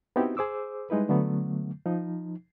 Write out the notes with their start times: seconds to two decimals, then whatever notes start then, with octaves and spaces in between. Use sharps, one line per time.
0.16 B3 C4 D#4 E4 F#4 G4
0.37 G#4 C5 D6 E6
0.90 G3 G#3 D#4 E4 B4
1.09 D3 F#3 A3 B3
1.86 F3 D#4